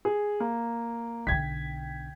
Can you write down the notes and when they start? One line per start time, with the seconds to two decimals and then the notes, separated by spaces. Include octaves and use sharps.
0.05 G#4
0.40 A#3
1.27 B1 D3 G5 G#6 B6